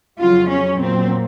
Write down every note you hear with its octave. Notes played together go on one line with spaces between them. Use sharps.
F2 C#3 F#3 F4
C#4
A#2 F#3 C4